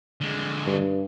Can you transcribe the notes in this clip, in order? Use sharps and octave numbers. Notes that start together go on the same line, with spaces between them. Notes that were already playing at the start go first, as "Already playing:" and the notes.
D3 G#3
G2